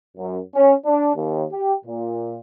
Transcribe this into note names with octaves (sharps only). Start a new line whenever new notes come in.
F#2
C#4
D4
D#2
G4
A#2